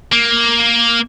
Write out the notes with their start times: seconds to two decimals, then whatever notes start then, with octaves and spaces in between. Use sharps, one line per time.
0.12 A#3